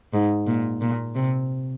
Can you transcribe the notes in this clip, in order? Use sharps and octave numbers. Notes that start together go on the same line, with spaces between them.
G#2
A#2
A#2
C3